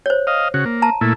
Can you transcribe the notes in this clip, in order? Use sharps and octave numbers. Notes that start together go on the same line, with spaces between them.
C5 C#5
D#5 F5
C#3 F#4
A#3
A5 A#5
A#2 A3 E4